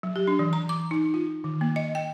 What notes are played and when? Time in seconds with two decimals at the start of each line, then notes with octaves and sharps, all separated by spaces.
0.03 F#3
0.16 G4
0.27 D4
0.39 E3
0.53 A#5
0.69 D6
0.91 D#4
1.14 F4
1.44 D#3
1.61 A#3
1.76 D#5
1.95 G5